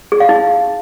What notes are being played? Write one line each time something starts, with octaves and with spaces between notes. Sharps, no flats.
G#4
F5
D#4